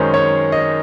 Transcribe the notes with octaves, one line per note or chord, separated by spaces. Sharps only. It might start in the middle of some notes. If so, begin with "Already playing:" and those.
Already playing: F#2 D#3 G#3 C#4 C5
C#5
D#5